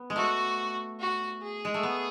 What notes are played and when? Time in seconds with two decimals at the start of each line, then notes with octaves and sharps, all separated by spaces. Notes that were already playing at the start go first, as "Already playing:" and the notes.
Already playing: B3
0.10 G#3
0.16 A3 F#4
1.00 F#4
1.42 G#4
1.65 G#3
1.74 A3
1.83 B3